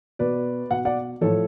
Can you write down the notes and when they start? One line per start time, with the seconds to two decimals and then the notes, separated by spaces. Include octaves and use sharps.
0.19 B2 B4 D5
0.71 B2 F#5
0.85 D5 F#5
1.21 A2 F3 A4 C#5